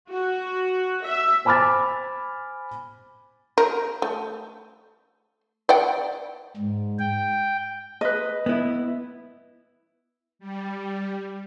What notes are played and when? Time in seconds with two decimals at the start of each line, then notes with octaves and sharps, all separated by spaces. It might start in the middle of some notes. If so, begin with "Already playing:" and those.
0.10 F#4
1.05 E5
1.45 C5 G#5 B5 D6 F6 A6
3.58 A#4
4.02 A3
5.69 D5 F#5 G5
6.57 G#2
6.99 G5
8.01 B4 D#5
8.46 B3 E4
10.39 G3